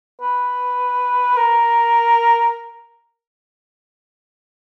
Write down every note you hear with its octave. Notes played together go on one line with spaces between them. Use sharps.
B4
A#4